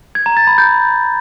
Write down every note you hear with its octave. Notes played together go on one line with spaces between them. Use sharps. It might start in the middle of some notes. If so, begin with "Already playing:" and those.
G#6
A#5
A6
B5
G6